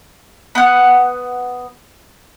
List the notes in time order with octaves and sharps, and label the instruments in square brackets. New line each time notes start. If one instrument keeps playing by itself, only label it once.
[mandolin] B3 F#5